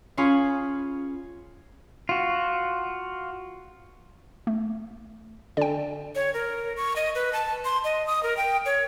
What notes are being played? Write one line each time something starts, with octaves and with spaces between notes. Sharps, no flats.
C#4 F4 G#4 B5
F4 F#4
A3
D3 D5 G5
C#5
A#4
C#6
D#5
B4
A5
C6
D#5
D#6
A#4
G5
C#5